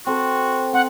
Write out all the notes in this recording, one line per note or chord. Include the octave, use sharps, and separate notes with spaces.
C4 F#4 A4
C4 F#5